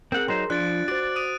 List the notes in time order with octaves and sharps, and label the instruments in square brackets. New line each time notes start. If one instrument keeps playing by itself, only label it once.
[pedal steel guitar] C4 F#5 [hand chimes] G#4 A#4
[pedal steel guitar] F#3 D#4 C5 [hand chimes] C6
[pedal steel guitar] F3 [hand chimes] D4 F4 D5 [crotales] F#6 A6 D7
[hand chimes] F#4 C5 [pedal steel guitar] D5 [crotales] D7
[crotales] D#6 D7 D#7